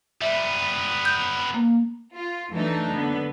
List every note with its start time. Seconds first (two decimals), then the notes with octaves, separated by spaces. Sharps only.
0.22 G3 B3 E5
1.05 G6
1.54 A#3
2.15 F4
2.53 E3 F#3 A3 D4 D#4
2.91 D3 B3